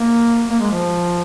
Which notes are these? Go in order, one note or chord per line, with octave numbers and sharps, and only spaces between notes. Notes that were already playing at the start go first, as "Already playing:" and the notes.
Already playing: A#3
A#3
G#3
F3